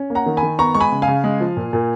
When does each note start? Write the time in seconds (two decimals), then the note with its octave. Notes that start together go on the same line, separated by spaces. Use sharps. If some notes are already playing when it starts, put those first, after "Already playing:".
Already playing: C#4
0.10 A#3
0.15 F#5 A#5
0.26 D#3
0.37 G#5 B5
0.43 D#3
0.59 B3 A#5 C#6
0.74 G#3 C#6
0.81 G#5 B5
0.92 C#3
1.02 F5 G#5
1.08 C#3
1.24 G#3
1.40 F3
1.57 A#2
1.73 A#2